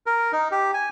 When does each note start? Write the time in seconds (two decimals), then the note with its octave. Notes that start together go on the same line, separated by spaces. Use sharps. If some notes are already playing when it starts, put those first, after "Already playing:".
0.06 A#4
0.33 D#4
0.51 G4
0.74 G#5